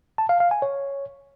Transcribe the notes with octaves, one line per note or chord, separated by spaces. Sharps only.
A5
F5
F5
G#5
C#5